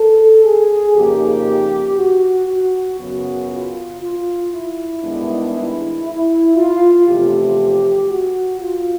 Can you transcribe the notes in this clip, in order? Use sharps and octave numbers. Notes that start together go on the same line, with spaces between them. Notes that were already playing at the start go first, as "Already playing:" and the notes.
Already playing: A4
G#4
F2 C#3 F3 A#3 D#4 G4
F#4
F#4
F#2 C#3 F#3 B3 F#4
F4
F4
E4
G2 D#3 G#3 B3 D4
E4
E4
F4
E2 C3 F3 A3 G4
F#4
F4